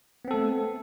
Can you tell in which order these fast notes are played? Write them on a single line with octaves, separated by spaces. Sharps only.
B3 C4 A4 A3